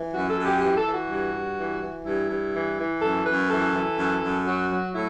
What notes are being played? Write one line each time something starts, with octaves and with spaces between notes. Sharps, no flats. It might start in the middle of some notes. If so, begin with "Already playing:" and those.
Already playing: E3
F#2 F#4
A4
F#2
G4
E3 G4
A4
E3
F#4
G2
G2
E3
E3
G2 E4
G2
E3
E3
F#2 A4
F#2 B4
E3 A4
E3
F#2
F#2
F#3 F#4
F#3
A2 E4